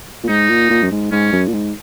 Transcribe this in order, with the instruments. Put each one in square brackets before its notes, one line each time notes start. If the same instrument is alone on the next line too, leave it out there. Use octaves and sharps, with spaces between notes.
[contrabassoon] A#2
[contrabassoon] G#2 [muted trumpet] D#4
[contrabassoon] A#2
A#2
F#2
G#2
[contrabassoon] G#2 [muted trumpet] C#4
[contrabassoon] F#2
A#2
G#2